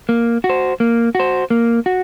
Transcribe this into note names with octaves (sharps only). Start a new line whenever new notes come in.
A#3
F#4
C5
A#3
F#4 C5
A#3
F#4